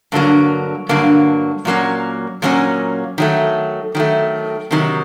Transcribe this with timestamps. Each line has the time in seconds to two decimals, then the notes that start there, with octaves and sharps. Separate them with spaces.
0.12 G2 D3 F#3 A#3
0.89 G2 D3 F#3 A#3
1.65 A#2 F#3 A#3 C#4
2.42 A#2 F#3 A#3 C#4
3.18 D#3 F#3 A3
3.95 D#3 F#3 A3
4.71 C3 D#3 F#3